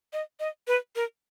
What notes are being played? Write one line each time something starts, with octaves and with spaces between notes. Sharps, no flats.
D#5
D#5
B4
A#4